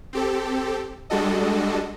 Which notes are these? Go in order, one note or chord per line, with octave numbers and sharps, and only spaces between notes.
C4 G4 A4
G3 G#3 D4 F#4 A4 D#5